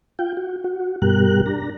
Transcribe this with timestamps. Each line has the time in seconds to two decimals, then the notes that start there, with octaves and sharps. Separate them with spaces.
0.19 F4 G5
0.37 F#4
0.64 F#4
1.02 G2 B2 G3 G4 A#4 F#6
1.46 D4 A#5